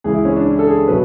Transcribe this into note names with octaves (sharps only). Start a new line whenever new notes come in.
C#2 C#3 E3 G#4
E4
C#4
D4
E4
A4
G#4
B2 F#3 B4